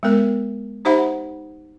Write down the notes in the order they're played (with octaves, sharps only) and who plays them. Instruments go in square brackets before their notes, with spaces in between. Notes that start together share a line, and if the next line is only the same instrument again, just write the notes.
[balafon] G#3 B3 A#4
D#4 G4 C5 E5 F#5 B5